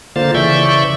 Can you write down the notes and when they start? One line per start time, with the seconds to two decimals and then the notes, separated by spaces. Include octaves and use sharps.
0.16 D3 A#3 F4 C5 A6
0.35 C#3 E3 D5 E5 C#6 G6